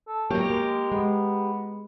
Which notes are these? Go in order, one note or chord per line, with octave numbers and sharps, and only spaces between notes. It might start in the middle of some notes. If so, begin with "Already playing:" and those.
A4
F#3 A#3 G4 A#4 C#5
G#3 A#3
G#3 B3